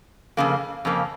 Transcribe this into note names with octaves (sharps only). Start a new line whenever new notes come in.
F2 C#3 A#3
F2 C#3 A#3